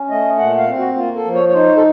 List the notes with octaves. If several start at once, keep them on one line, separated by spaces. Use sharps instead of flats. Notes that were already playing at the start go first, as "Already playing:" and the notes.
Already playing: C#4
A3 D#5
A#2 F#5
F5
C4
F#4
A#3 F4
A4
F3
C#5
C#5
D#4 C5
A4